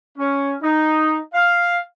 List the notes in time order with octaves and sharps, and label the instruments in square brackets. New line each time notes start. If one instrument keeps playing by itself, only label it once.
[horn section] C#4
D#4
F5